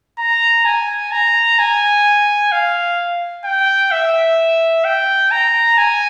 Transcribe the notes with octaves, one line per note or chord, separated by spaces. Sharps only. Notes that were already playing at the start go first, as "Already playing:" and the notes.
A#5
G#5
A#5
G#5
F5
G5
E5
G5
A#5
G#5